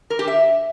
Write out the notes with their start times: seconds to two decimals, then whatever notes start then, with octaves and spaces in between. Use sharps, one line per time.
0.10 A#4
0.19 G4
0.28 E5